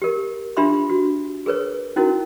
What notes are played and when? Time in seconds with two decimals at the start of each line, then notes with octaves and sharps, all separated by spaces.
0.02 G4 A#4
0.57 D4 F4 G4 E5 B5 C6
0.90 F#4
1.46 G#4 A#4 B4 C#5
1.96 C#4 D#4 E4 F#4 A#4